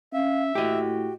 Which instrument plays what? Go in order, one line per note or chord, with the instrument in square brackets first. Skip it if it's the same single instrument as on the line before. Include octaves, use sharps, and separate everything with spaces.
[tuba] C#4 [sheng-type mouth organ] E5 [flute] F5
[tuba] A2 [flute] F#4 [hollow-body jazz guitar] G4 D#5